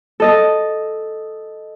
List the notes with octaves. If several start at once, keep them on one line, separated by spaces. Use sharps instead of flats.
A4 D#5 A5